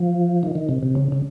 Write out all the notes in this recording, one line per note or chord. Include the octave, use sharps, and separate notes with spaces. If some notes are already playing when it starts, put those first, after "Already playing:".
Already playing: F3
D#3
D#3
C3
C3
C#3
C#3